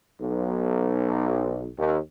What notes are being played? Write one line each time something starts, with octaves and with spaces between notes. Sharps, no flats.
B1
D#2